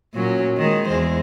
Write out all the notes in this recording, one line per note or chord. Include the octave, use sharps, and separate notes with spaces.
A#2 F#3 C#4
D#3 G#3
E2 G#3 C5